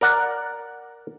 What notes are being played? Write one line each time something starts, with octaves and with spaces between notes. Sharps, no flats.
A#4 D5 F#5